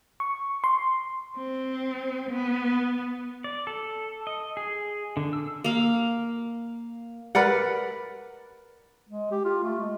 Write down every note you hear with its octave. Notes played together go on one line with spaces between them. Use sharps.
C#6
C6
C4
B3
D5
A4
D#5
G#4
D3
E6
A#3 F5
A#4 B4 D5 F#5
G#3
G4
F4
A3
G#3